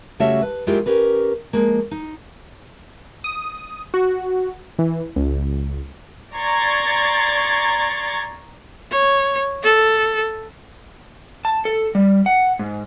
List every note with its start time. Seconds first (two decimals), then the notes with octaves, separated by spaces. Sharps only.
0.20 C#3 G3 A3 F#4 C#5 E5
0.42 B4
0.67 F#3 G#3 A#3 E4 F4 G4
0.86 C#4 G4 A#4 B4
1.53 F3 G#3 A#3
1.91 D#4
3.24 D#6
3.94 F#4
4.79 E3
5.16 C#2
6.35 D5 A#5 C6 C#6 G#6 A6
8.91 C#5
9.63 A4
11.45 A5
11.65 A4
11.95 G3
12.26 F#5
12.59 G#2